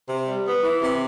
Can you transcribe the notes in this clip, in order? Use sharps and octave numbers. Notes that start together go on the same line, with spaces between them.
C3
G3
B3
E3
C3